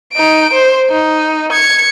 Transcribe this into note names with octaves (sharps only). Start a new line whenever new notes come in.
D#4 D7
C5
D#4
G#6 C#7